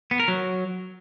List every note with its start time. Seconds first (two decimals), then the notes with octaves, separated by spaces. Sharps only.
0.11 B3
0.20 A#4
0.28 F#3